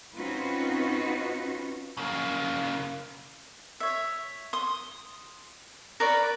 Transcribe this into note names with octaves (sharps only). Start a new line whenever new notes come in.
C4 C#4 D#4 F4 F#4 B4
C#3 A#3
C#5 E5
C6 D#6
A#4 B4 C#5 D5